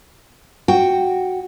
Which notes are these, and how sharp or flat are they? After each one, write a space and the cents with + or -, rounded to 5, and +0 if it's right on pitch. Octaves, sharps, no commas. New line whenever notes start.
F#4 +0 G5 +0